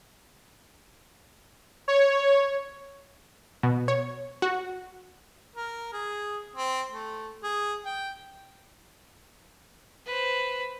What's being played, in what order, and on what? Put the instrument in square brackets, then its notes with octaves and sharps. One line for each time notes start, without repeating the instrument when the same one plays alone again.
[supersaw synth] C#5
[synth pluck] B2
C#5
F#4
[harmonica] A#4
G#4
C4
A3
G#4
G5
[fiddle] B4 C5